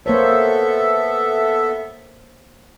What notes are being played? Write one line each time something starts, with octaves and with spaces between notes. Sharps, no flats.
A#3 B3 A4 C5 C#5 E5